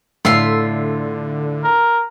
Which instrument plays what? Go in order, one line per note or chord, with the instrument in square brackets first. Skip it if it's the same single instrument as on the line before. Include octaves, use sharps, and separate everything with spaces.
[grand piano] A2 [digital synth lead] D3 [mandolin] F4 E5 C6
[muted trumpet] A#4